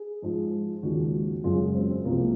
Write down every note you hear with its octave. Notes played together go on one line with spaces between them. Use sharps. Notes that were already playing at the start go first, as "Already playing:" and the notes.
Already playing: G#4
G#2 F3 G#3
D#2 C#3 F3 G#3 F#4
F#2 C#3 G#3 F4
C4
C4
C2 C3 F3 G#3 A#3